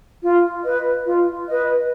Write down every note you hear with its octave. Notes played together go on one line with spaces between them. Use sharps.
F4
B4 D#5
F4
B4 D#5